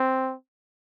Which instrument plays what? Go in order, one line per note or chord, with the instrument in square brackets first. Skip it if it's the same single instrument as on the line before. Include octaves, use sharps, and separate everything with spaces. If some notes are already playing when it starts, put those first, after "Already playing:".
Already playing: [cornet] C4